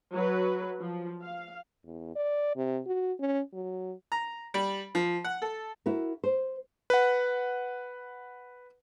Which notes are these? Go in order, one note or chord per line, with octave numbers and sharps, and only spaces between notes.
F#3 B4
F3
F5
E2
D5
C3
F#4
C#4
F#3
A#5
G3
F3
F#5
A4
E4 F#4 A#4
C5
B4 F#5